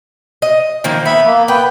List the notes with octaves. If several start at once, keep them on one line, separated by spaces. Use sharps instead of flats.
D#5
D#3 F3 A#3
B3 E5 B5
A#3
B3 B4 G5